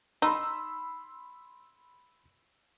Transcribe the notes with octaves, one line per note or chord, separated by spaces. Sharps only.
D#4 B5 C6 E6